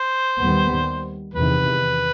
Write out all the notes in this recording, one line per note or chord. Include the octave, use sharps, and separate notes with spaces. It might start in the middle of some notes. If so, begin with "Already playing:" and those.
Already playing: C5
D#2 D#3 G3 B3
E2 C3 D#3 B4